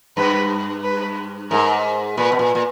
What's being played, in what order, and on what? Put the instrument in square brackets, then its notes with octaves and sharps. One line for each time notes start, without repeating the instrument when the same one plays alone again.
[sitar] G2 [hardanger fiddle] B4
[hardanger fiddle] B4
[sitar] G#2 [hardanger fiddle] A#4
[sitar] A#2 [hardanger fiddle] B4
[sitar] B2
A#2
A#2